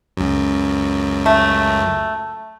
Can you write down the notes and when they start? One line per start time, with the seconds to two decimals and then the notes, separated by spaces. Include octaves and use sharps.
0.17 C#2 F#2
1.26 A3